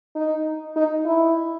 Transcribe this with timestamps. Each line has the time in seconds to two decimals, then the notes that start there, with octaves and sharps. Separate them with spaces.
0.16 D#4
0.76 D#4
1.05 E4